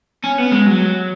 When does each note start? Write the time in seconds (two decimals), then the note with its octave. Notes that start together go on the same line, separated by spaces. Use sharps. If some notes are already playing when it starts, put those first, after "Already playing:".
0.24 C#4
0.38 B3
0.52 G#3
0.67 F#3